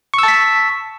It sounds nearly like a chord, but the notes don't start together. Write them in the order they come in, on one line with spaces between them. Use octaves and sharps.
C#6 E6 A5 B6